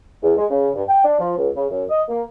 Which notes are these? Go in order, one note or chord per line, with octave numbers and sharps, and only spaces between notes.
E2
G#3
C#3
G2
G5
D4
F3
C#2
C#3
F#2
D#5
A#3